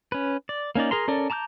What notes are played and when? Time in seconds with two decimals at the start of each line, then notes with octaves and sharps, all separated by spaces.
0.12 C#4 B4
0.49 D5
0.75 A#3 C#4 D#4 D5
0.91 G#4 A#4 A#5 C6
1.08 C#4 A4 A#4 D5
1.30 A5 A#5 D6 F6 G6